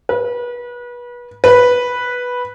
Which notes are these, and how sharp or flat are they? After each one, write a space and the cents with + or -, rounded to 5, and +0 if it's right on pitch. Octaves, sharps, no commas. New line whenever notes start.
B4 -30
B4 -5